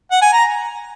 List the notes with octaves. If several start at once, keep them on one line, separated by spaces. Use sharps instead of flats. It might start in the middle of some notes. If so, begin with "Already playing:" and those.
F#5
G#5
A#5